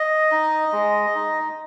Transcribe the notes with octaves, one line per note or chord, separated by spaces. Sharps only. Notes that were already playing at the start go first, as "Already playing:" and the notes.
Already playing: D#5
D#4
G#3
D#4